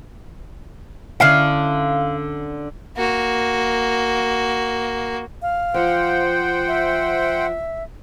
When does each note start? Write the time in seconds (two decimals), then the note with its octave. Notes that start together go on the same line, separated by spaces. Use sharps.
1.20 D3 C#4 E4 F5
2.97 A#3 F#4
5.42 F5
5.74 F3 C5 F#5 G5
6.68 E5